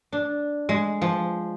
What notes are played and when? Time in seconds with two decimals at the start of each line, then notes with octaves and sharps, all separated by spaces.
0.12 D4
0.69 G#3
1.02 F3